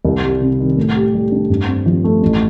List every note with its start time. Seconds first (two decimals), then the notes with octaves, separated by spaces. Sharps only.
0.05 C2
0.23 G3
0.41 C3
0.59 D#3
0.77 A2
0.95 G4
1.14 G3
1.32 D4
1.50 G2
1.67 C4
1.86 F3
2.04 A3
2.22 A1